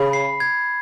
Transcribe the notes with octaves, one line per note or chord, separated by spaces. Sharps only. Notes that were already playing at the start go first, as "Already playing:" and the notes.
Already playing: C#3 B5
C7
G#6